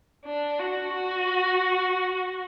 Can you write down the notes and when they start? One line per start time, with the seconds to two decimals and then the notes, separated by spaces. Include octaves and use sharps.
0.25 D4
0.59 F#4
0.92 F#4